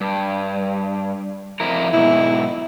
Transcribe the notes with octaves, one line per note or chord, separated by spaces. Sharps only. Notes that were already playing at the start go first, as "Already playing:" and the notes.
G2
F2 E4 A#4
G#2 B2 E4